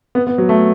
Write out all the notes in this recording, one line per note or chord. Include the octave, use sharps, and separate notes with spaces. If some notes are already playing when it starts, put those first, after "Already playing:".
B3
B3
F#3
A3